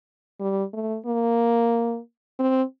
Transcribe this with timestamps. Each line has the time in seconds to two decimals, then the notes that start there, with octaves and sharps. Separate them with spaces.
0.40 G3
0.73 A3
1.06 A#3
2.39 C4